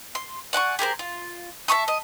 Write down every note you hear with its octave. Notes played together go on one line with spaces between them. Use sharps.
C6
D5 F#5 G#5 C#6
G4 G#4 A#4 C5
F4
E5 A5 C#6 D#6
D#5